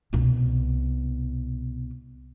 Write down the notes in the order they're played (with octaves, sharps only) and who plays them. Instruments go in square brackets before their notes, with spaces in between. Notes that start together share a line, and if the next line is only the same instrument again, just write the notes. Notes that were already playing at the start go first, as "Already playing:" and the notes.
[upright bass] C2 B2